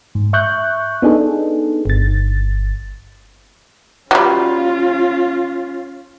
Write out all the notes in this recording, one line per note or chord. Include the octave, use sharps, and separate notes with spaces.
G#2
E5 C#6 F#6 G6
B3 D4 D#4 G#4 A4
G1 A6
F#3 G3 C#4 F4